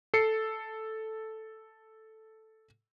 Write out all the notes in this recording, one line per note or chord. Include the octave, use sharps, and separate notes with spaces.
A4 C7 C#7